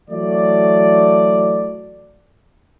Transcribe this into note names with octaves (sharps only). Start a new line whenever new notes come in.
E3 F#3 A3 D5